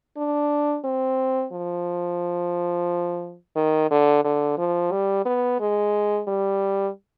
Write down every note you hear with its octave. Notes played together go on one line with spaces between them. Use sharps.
D4
C4
F3
D#3
D3
D3
F3
G3
B3
G#3
G3